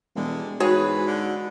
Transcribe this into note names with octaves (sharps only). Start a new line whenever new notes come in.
E1 D3 G3 G#3
G#2 E3 F#4 G#4 B4 C#5
D3